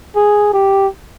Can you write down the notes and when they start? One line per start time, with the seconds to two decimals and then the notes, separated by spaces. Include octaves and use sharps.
0.16 G#4
0.53 G4